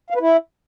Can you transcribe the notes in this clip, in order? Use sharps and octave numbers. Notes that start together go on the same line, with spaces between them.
F5
B4
E4